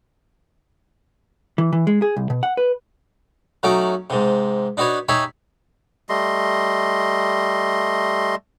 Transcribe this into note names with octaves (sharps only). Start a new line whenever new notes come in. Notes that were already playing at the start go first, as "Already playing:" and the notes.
E3
E3
G#3
G#4
C2
B2
F#5
B4
F#3 A3 C#4 D#4 F#4 D6
G#2 C3
D4 D#4 F#4 B4 C#5
D#4 G4 C#5 E5 G#5 B5
G3 A3 D#5 C6